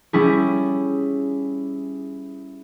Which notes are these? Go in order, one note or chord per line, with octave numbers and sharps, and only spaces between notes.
G3 C#4 E4 G#4